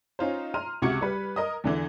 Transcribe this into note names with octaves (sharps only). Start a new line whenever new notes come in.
C#4 D#4 F4 C5
A#5 C6 F6 D#7
C#2 C3 F#4 C#6 G#6 C#7
G3 B4
A#4 D#5 D#6
E2 D3 E3